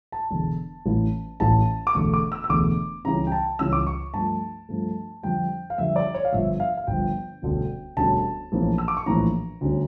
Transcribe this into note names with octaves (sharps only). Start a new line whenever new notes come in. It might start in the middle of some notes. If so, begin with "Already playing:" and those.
A5
E1 E2 D3
A1 A2 E3
A1 A2 E3 A5
D6
E1 E2 D3 A3 C#6
D6
E6
E6
E1 E2 D3 A3 D6
C#2 C#3 E3 G3 C#4 A#5
G5
A5
C#2 C#3 E3 G3 C#4 E6
D6
C#6
G2 F3 A3 A5
G2 F3 A3
F2 D3 G3 G5
F5
F2 D3 G3 E5
D5
C#5
F5
G1 G2 F3 E5
E5
F5
F5
G1 G2 F3 G5
E1 D2 D3 G3 C#4
E1 D2 D3 G3 C#4 A5
A#1 A2 E3 A#3 C#4
E6
D6
C#6
A#1 A2 E3 A#3 C#4 A#5
D2 D3 G3 C#4